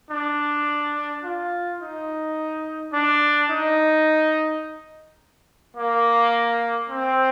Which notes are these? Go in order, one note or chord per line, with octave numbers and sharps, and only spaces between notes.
D4
F4
D#4
D4
D#4
A#3
C4